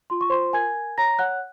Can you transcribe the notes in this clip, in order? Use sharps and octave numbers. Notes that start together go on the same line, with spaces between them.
F4 C6
C#6
F4 C5 C6
A#4 G#5 G#6
A#4
C#5 A#5 A#6
C#5 F#5 F#6